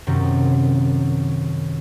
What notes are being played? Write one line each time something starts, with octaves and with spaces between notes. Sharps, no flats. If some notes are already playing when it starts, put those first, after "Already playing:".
F#2 C3 D#3